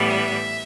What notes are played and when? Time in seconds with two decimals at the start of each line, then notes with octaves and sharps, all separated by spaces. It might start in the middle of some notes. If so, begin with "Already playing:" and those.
Already playing: A2 E3 G3 B3
0.09 E5